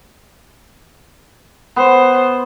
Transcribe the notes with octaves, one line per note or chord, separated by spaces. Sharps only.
B3 C5